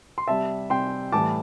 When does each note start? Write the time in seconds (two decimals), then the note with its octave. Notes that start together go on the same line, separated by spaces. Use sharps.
0.18 C6
0.28 C3 G3 E5 A5
0.70 C3 G3 G5 C6
1.12 A2 E3 G3 A5 D6